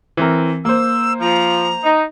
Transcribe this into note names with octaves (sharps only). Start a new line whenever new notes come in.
E3 C4 A#4
A#3 C5 E6
F3 A#5
D#4